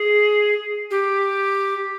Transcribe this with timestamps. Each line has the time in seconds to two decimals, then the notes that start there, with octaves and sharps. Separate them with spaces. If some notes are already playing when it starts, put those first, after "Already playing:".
Already playing: G#4
0.91 G4